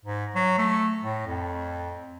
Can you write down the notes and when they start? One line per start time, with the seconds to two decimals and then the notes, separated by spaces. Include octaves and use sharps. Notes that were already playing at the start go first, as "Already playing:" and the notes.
0.05 G#2
0.35 F#3
0.58 A3
1.02 A2
1.27 F2